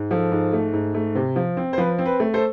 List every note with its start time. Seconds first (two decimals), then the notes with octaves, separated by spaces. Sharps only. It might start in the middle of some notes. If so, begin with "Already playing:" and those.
Already playing: G#2
0.11 F3 A4
0.32 G#2
0.53 A3
0.73 G#2
0.94 A3
1.15 C3
1.36 F3
1.57 C4
1.73 C5
1.78 F3 B4
1.99 C4
2.06 B4
2.20 A3
2.34 A4 C5